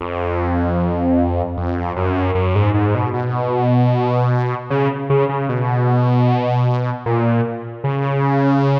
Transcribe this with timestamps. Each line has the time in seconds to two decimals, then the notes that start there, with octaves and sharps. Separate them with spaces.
0.01 F2
1.57 F2
1.96 F#2
2.35 F#2
2.55 G#2
2.74 G#2
2.95 B2
3.13 B2
4.70 C#3
5.10 C#3
5.29 C#3
5.49 B2
7.06 A#2
7.84 C#3